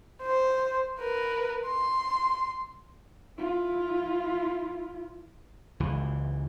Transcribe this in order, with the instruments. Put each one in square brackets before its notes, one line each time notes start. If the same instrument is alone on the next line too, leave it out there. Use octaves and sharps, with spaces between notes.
[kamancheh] C5
A#4 B4
C6
[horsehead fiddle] E4 F4
[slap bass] C#2 E3